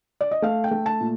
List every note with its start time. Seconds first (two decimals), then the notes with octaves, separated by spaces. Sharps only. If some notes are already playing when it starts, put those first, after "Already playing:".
0.21 D5
0.31 D#5
0.42 A3 F5
0.64 G5
0.71 A3
0.86 A5
1.00 A#2